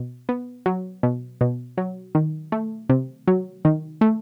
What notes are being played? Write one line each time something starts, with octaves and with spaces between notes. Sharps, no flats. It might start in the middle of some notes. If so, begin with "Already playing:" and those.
Already playing: B2
B3
F#3
B2
B2
F#3
D#3
A3
C3
F#3
D#3
A3